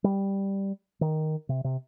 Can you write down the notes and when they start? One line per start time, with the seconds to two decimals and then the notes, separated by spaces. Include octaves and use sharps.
0.04 G3
1.01 D#3
1.49 C3
1.64 C3